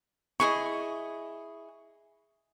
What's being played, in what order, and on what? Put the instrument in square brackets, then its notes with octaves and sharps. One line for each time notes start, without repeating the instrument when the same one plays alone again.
[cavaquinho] E4 G#4 D#5 [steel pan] C#6